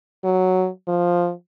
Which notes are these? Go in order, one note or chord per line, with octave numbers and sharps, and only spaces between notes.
F#3
F3